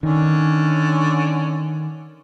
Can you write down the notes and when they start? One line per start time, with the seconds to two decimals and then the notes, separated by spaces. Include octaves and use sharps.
0.03 D3 D#3 C#4